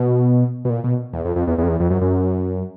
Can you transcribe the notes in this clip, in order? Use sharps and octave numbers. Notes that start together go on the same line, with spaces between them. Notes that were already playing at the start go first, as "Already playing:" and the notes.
Already playing: B2
B2
A#2
B2
E2
F2
F2
E2
E2
F2
E2
F2
F#2
F#2